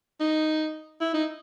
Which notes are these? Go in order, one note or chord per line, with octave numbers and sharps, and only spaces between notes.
D#4
E4
D#4